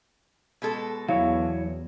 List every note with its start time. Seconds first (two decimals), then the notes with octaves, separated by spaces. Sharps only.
0.62 B2 G#3 A4
1.09 E2 F#3 E4 C#5 F5